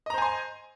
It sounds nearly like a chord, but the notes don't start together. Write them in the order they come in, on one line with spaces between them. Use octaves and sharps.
D#5 A#5 C5 G#5 C6